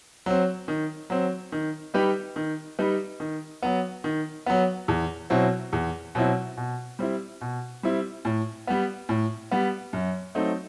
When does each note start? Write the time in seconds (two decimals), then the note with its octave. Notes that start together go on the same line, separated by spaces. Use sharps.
0.26 F#3 C4
0.68 D#3
1.10 F#3 C4
1.52 D#3
1.94 G3 D#4 G4 B4
2.36 D#3
2.79 G3 D#4 G4 B4
3.20 D#3
3.63 F#3 B3
4.04 D#3
4.46 F#3 B3
4.88 E2
5.30 B2 F#3 C4 E4
5.73 E2
6.15 B2 F#3 C4 E4
6.57 B2
6.99 G3 C4 E4
7.41 B2
7.83 G3 C4 E4
8.25 A2
8.67 G3 B3
9.09 A2
9.51 G3 B3
9.93 F#2
10.35 F#3 A3 C4 D#4